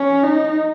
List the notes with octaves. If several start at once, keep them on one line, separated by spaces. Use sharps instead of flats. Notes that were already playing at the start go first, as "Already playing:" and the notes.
Already playing: C#4
D#4